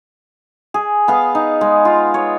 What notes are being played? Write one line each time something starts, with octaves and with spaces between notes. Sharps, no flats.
G#4
B3 F5
D#4
G#3
F4
C#5